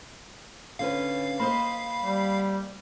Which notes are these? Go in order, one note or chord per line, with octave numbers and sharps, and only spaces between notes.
D3 C#4 B4 F5
A#3 C5 D#5 B5
G3